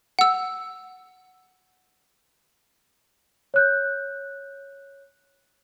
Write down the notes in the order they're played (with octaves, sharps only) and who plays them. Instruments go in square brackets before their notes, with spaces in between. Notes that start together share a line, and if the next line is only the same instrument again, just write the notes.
[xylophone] F#5 E6
[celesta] C#5 F#6 G6